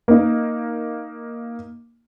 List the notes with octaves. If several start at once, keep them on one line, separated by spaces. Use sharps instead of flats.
A#3 D#4